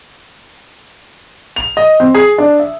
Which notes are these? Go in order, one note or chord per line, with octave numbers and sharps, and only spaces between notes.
F7
D#5
C4
G#4
D4
E5